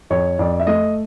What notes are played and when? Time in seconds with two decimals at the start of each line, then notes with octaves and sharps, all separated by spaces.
0.10 F2 C#5
0.39 F2 D5
0.60 E5
0.67 A3 D#5